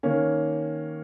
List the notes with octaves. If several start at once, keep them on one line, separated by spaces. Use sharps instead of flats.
D#3 A#3 C#4